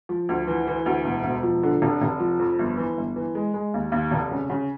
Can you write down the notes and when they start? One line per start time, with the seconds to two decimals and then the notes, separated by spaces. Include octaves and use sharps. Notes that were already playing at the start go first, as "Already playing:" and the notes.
0.09 F3
0.29 D2
0.47 E3
0.67 E3
0.86 D2
1.05 E1
1.24 E1
1.43 F3
1.63 D3
1.82 F1
2.02 F1
2.20 F3
2.39 F2
2.59 G1
2.77 E3
2.97 G1
3.16 E3
3.35 G#3
3.54 G#3
3.74 D#2
3.92 D#2
4.11 F1
4.31 C#3
4.50 C#3